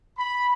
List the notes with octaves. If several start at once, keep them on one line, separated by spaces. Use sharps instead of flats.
B5